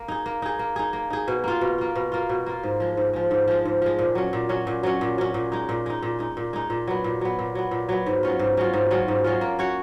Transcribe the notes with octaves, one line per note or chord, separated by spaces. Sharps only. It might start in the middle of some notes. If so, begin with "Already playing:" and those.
Already playing: A#3
D#4 G#4
A#3
D#4 G#4
A#3
D#4 G#4
A#3
D#4 G#4
B2
A#3 F4
B2
A#3 F4
B2
A#3 F4
B2
A#3 F4
G#2
F3 G#3
G#2
F3 G#3
G#2
F3 G#3
G#2
F3 G#3
A#2
F#3 C#4
A#2
F#3 C#4
A#2
F#3 C#4
A#2
F#3 C#4
A#2
G#3 D#4
A#2
G#3 D#4
A#2
G#3 D#4
A#2
G#3 D#4
A#2
F#3 B3
A#2
F#3 B3
A#2
F#3 B3
A#2
F#3 B3
G#2
F#3 C#4 F4
G#2
F#3 C#4 F4
G#2
F#3 C#4 F4
G#2
F#3 C#4 F4
A#3
C#4 F#4 C#5